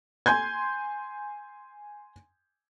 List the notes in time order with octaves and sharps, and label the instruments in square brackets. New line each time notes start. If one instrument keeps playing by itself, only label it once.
[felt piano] G#5 C6 G6 G#6